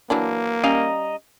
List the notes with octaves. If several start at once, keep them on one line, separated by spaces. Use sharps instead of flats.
E3 F#3 A#3 D4
G3 C#4 D#5 F5 A#5